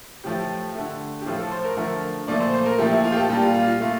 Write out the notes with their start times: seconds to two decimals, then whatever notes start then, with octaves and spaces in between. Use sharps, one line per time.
0.24 A2 F3 A3 G4
0.75 D3 A3
1.22 G4
1.26 A2 F3 A3 F4
1.38 A4
1.52 C5
1.64 A#4
1.77 D3 F3 A3 A#4
2.28 A#2 F3 A3 D5
2.40 C5
2.53 C5
2.66 A#4
2.78 A#2 F3 A3 G4
2.91 E4
3.04 F4
3.12 G4
3.16 A4
3.29 A#2 G3 G4
3.42 F4
3.55 F4
3.68 F4
3.80 A#2 A3 F4